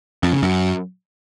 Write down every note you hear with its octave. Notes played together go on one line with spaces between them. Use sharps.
F2
C#3
F#2